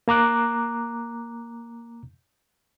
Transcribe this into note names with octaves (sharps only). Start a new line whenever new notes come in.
A#3 A#5 D6 F#6